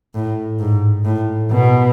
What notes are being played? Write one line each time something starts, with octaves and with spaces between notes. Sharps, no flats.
A2
G#2
A2
B2